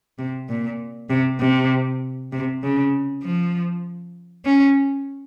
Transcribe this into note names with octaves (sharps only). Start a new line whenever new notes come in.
C3
A#2
C3
C3
C3
C#3
F3
C#4